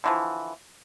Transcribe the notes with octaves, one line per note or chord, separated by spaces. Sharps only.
D3 E3 F3